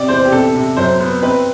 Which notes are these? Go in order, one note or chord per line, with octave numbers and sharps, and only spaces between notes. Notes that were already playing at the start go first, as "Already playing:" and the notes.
Already playing: C3 D5
E2 C5
G4
C3 A4
C3
F#2 C5
B3
C4 B4